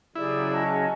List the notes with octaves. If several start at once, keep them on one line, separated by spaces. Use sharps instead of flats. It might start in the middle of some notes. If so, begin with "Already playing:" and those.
C#3 F#3 E4 G4 G#4 D5
C#4 D#5 A5